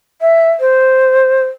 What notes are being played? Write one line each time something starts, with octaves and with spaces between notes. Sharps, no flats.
E5
C5